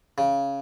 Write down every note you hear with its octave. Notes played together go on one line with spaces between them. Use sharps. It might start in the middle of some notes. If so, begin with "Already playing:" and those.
C#3